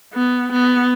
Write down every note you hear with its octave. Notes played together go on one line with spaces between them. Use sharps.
B3
B3